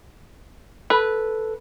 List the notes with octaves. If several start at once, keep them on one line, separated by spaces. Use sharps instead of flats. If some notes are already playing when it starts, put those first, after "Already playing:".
A4 B4